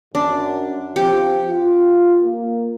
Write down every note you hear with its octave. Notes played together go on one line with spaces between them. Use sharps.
F#2 D4
F3 C4 G4
F4
A#3